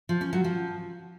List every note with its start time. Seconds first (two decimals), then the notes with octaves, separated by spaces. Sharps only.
0.09 F3
0.21 C#4
0.33 F#3
0.44 F3